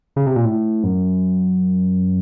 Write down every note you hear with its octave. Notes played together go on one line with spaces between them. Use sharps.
C#3
C3
A#2
A2
F#2